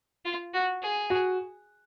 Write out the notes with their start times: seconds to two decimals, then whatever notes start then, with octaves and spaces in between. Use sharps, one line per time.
0.25 F4
0.54 F#4
0.82 G#4
1.10 F#4